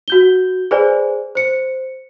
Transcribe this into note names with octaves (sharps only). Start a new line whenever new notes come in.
F#4 G6 G7
G#4 B4 C5 D5 G#5
C5 C#7